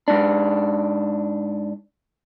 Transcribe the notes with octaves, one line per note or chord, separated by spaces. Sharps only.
G#2 D4